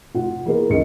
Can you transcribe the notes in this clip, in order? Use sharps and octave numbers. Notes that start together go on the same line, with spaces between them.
F1 F4 F#5
E3 A#3 B3 G#4 A#4
C#2 D#3 A#4 D#5 C#7